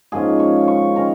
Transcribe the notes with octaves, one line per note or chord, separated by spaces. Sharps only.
G#2 F3 A#3 C#4 G#4
C#5
C#6
D#3 C#4 A#5